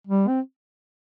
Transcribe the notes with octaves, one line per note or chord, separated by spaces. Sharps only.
G3
C4